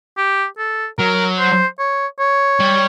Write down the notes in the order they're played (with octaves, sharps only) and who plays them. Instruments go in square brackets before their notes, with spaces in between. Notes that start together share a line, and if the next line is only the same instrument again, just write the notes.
[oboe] G4
A4
[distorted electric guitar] F#3 [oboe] A#4
[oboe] C5
C#5
C#5
[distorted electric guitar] G3